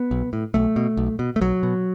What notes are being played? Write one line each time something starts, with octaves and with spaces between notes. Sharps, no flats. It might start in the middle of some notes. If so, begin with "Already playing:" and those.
Already playing: B3
B1
A2
B1 A3
B2
B1
B2
A3
B1 F#3
B2